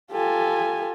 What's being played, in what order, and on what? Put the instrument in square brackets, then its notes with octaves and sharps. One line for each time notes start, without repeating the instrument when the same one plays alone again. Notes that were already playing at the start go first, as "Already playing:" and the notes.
[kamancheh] F4 A4 [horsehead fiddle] G4 G#5